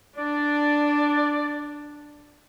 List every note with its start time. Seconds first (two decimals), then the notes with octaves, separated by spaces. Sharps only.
0.16 D4 D5